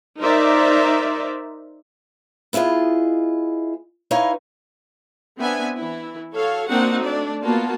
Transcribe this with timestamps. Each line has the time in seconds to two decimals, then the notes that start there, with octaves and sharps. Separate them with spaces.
0.19 D#4 A#4 C5 D5 E5
2.53 B3 E4 F4 G#4 D#5
4.11 D#4 E4 B4 C#5 D#5 F5
5.38 B3 C4 D4 E5 G#5
5.76 E3 E4
6.33 F#4 A4 C#5 F5
6.69 A#3 C4 D4 D#4 F#4 F#5
7.02 A3 D4 D5
7.43 A#3 B3 F4 F#4 A5